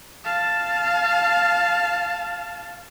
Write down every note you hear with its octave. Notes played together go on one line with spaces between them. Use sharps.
F5 A5